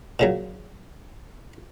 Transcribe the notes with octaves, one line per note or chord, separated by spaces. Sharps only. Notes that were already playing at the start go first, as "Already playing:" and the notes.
A#2 C#3 F#3